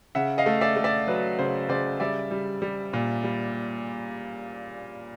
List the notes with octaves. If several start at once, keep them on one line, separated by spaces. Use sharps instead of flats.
C#3 E5 F#5
D#5 F5
A3
D5 E5
A3
D5 E5
F#3 B4
C#3 C5
C#3 C5 D5
G3 D5 E5
G3
G3
A#2
G3